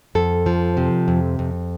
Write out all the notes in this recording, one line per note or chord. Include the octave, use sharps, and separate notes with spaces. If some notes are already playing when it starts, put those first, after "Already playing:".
F2 A4
F3
C3
F2
F2